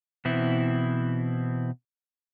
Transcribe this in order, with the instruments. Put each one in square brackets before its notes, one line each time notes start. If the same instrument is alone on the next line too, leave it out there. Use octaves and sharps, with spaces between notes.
[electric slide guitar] B2 E3 C4 E4